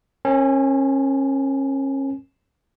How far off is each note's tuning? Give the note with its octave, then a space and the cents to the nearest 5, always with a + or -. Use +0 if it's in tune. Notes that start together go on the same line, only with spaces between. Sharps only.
C#4 -35 A#4 +0 G#5 +25